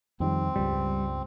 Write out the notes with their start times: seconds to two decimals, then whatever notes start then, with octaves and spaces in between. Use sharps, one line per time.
0.20 F2 D#3 G3 C4
0.56 C#2 G2 G3